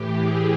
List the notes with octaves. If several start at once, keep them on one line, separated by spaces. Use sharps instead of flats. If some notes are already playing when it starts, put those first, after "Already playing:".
Already playing: A2 E3 G4
G#4